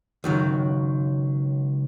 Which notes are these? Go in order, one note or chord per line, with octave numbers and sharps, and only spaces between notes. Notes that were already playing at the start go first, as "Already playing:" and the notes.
C#2 D#3 F#3